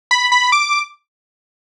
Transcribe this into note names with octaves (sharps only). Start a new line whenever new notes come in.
B5
B5
D6